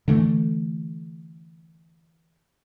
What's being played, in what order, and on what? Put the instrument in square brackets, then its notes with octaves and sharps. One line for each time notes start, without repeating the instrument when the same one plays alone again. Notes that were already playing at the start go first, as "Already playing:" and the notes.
[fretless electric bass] D3 E3 A3